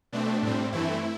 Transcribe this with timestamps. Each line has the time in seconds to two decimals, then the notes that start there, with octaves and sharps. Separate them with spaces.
0.13 B2 A3 C4 D4
0.43 A2 G3 C4
0.72 G2 E3 A3 C4 E4